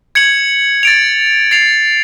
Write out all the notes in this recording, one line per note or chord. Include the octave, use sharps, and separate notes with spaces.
G#6 C#7 F#7
A6 D7 F7
A6 C7 F7